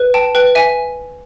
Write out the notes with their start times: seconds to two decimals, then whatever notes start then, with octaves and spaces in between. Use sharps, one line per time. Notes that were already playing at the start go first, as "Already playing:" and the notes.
Already playing: B4
0.14 G5 A5
0.35 B4 G5
0.55 E5 G#5